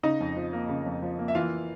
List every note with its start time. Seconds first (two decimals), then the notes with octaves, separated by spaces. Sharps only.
0.03 C#3 D#4 D#5
0.20 F2
0.37 F3
0.53 A#3
0.69 C#3
0.86 F2
1.02 F3
1.19 A#3
1.28 E5
1.35 E3 F4 F5